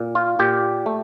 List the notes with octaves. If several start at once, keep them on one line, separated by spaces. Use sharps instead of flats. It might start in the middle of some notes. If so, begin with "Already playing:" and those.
Already playing: A#2
F4
A#2 G4
A3